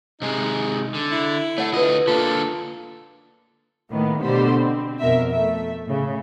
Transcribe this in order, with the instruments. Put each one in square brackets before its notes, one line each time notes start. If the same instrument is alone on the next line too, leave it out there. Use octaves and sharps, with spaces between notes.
[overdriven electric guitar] C3 G#3 [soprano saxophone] D#4
[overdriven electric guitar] D3
[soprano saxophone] E4
[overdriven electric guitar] A3 [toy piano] C#5 F#5
[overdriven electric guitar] D2 D#5 [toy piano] F4 B4
[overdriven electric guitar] D3 A#3 [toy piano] F4 [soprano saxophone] A4
[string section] A2 D#3 A#3 B3
B2 D3 G4 C5 B5
C4
F2 B2 A#4 E5
A3 E5
A2 C#3